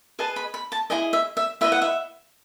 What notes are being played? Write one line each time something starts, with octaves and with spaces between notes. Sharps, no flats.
G#4 B4 D#5 A5
B5
B5
A5
E4 G#4 D#5 G#5
E5
E5
E4 B4 D#5 E5
F#5
E5